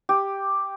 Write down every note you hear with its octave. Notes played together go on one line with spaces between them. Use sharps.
G4